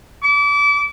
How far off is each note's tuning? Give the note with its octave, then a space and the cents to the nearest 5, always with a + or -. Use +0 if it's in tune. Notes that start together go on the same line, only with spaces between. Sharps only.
D6 -35